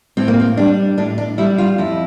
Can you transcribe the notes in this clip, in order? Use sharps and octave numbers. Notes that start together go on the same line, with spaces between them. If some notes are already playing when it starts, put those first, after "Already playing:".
A2 C4
A#3
C4
G3 D4
A2 D4
D4
G3 E4
F4
F2 E4